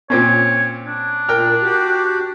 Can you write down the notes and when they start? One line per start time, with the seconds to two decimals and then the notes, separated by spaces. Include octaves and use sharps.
0.10 A#2 C4 C#4 C#5
0.86 D4
1.28 A#2 A#4 G5 F6
1.62 F#4 G4